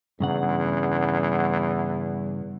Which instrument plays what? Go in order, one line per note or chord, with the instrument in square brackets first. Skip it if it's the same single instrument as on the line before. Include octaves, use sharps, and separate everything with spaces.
[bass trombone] E2 [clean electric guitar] G2 C#3 F#5